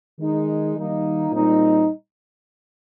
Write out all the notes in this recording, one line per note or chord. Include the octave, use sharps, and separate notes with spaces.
D#3 G#3 D#4
D#3 G3 A#3 D#4
A#2 G3 C4 D#4